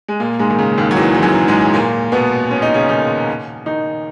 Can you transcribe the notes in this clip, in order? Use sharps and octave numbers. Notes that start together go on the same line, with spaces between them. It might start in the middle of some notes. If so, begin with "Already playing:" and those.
G#3
A#2 A#3
G#2 G#3
D#3
C#3
D#2 D#3
F#3
E2 E3
E3
F#2 F#3
G#2 G#3
A#2 A#3
B2 B3
C#4
D#4
C#3 C#4
D#3 D#4
D#3 D#4